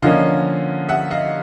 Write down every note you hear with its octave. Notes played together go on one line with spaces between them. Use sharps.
D3 F3 A#3 C#4 D#5 F5
E5 F#5
D#5 F5